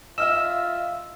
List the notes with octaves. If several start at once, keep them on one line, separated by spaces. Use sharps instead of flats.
F4 D#5 E5 E6 F6 E7